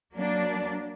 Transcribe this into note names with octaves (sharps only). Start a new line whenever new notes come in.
F#3 A#3 D4